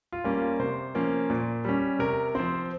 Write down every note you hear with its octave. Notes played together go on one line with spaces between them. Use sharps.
F4
G3 A#3 C#4
F4
C3 C5
F3 A#3 C#4
A#2
G3 C#4
C3 A#4
F3 C4 C5